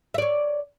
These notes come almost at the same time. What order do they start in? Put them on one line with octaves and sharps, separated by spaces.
E5 D5 C#5